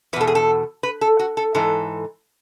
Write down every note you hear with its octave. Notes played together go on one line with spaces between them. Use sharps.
E2 B2 A4 B4
G#4
A4
B4
A4
F#4
A4
G#2 E3 A4